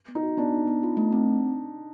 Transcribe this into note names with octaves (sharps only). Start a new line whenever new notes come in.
B3
D#4
F#4
B3 D4
D#4
B3
F4
A3
C4